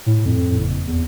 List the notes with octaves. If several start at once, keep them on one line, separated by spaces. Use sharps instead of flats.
A2
F2
F#1
E2